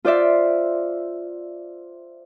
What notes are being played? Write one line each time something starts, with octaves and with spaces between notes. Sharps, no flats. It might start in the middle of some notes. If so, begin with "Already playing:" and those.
F4 C5 D5 E5